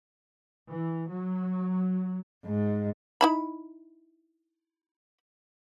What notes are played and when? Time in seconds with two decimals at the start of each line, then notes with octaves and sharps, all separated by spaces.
0.68 E3
1.09 F#3
2.45 G#2
3.21 D#4 E4 B5